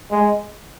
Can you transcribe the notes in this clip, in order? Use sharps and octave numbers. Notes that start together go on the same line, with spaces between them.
G#3